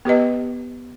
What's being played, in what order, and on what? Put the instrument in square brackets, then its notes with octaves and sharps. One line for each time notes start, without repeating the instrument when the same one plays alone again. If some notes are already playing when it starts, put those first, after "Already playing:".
[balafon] B3 G4 B4 D#5